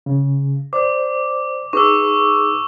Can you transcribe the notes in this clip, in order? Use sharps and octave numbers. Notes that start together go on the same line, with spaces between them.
C#3
C5 D5 D6
D#4 G#4 B4 C#6 D6 E6